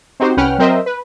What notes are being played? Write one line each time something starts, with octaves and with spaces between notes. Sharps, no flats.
C4 D#4 F#4 G4 C5
C2 C#4 B4 F#5 G5 F6
F#3 C4 A#4 C5 D#5 E5
B4